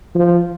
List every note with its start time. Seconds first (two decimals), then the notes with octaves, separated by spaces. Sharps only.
0.15 F3